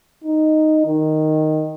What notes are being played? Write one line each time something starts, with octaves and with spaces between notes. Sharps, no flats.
D#4
D#3